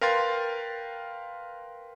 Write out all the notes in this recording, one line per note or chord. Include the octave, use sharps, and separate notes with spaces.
A#4 B4 F5 G5 C6 A6